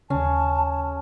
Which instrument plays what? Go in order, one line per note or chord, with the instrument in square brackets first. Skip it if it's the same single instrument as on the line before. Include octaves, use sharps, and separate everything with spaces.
[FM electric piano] D#2 C#3 [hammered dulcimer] C#4 [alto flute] A5